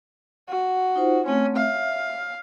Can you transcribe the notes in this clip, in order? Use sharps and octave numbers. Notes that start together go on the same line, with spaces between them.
F#4
D#4 F4 C5
A3 C4 C#4
E5 F5